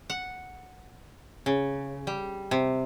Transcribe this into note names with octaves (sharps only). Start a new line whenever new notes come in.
F#5
C#3
G3
C3